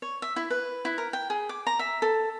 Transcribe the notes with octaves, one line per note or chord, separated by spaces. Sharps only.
C#5
E5
E4
B4
E4
A#4
G5
G#4
D6
A#5
E5
A4